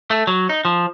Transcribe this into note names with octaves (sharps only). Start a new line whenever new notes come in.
A3
F#3
D#4
F3